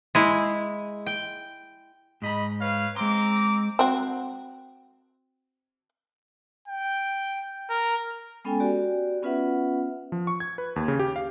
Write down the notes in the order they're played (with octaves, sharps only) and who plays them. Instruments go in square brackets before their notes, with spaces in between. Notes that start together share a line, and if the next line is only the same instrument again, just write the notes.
[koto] G#3 E4
G5
[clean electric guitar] G#2 A#5 [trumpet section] D#5 B5
[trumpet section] B4 C#5 F5
[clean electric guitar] G#3 C6 [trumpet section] C4 A#5 D6
[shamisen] C4 F#4
[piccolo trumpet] G5
A#4
[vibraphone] G#3 B3 C#4 A4 G5 G#5
F#4 G4 D5
B3 C#4 F4 B4 E5 F#5
[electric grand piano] F3
C#6
G#6
B4
D#2
C#3
G4
F5